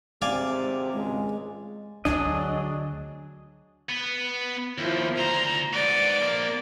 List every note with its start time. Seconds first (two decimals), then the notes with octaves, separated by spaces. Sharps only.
0.22 G#1 C3 C4 D5 F5 G#5
0.93 C#2 G#3
2.05 D2 F#3 D4 G#4 D#5
3.90 B3 B4
4.78 D#2 F3 E4
5.18 D2 C5 A#5
5.74 G#2 B3 D5
6.22 F3 A#3